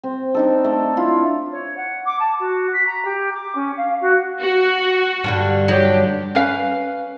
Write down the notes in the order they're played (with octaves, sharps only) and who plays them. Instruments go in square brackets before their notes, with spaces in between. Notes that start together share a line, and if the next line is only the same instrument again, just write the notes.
[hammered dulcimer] C4
D4 D#4 A4
A3 D4
E4 F4
[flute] C#5
F#5
D6
A5
F#4
B6
A#5
G4
D6
C#4
F5
F#4
[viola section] F#4
[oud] G2 D3 G3
[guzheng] F#3 [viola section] G4
[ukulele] C#4 B4 F5